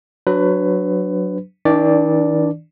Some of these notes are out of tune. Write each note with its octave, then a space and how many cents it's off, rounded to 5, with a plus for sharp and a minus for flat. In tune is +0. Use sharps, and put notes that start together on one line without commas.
F#3 +0 D4 -5 B4 +20
D#3 +45 D4 -10 D5 +0